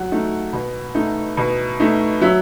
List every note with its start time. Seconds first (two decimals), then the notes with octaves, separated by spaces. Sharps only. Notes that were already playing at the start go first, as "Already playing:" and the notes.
Already playing: F#3 F#5
0.12 A3 D#4
0.53 B2
0.95 A3 D#4
1.37 B2
1.80 A3 D#4
2.21 F#3 E5